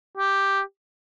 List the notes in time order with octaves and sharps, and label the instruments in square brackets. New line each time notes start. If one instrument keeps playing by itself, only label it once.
[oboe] G4